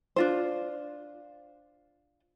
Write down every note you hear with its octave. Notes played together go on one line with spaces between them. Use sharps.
D4 F4 C5